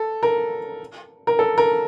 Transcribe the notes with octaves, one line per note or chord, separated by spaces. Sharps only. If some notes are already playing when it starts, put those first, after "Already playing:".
Already playing: A4
A#4
A#4
A4
A#4